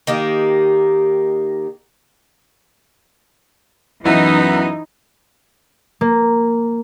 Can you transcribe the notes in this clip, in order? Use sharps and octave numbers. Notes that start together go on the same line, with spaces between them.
D#3 A#3 G4
F#2 E3 B3 D#4 E4
A#3